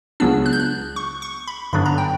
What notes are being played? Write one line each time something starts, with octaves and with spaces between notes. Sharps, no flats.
C#2 C#3 F#3 B3 D4 E6
F#6
G6
F#6
C#6
C#6
B5
G2 D3 F#3 B3 D4 B5
A#5
G5